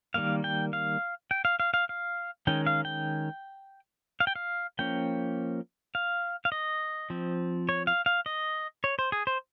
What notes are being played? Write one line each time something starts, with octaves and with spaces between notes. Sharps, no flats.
D#3 G3 A#3 F5
G5
F5
G5
F5
F5
F5
F5
D#3 G#3 C#4 G5
F5
G5
F5
G5
F5
F3 A#3 C#4 G5
F5
F5
D#5
F3 C4
C#5
F5
F5
D#5
C#5
C5
G#4
C5